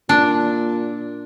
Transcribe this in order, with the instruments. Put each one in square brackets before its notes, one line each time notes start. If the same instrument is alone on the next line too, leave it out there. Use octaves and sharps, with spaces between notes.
[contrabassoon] A#2 [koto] D4